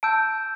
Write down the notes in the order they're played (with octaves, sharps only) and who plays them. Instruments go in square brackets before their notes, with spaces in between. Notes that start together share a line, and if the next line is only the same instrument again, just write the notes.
[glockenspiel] A5 E6 G6 D7